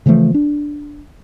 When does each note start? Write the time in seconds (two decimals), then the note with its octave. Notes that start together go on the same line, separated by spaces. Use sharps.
0.06 C#3 E3 F3 A3
0.34 D4